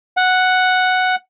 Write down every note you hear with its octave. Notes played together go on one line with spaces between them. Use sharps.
F#5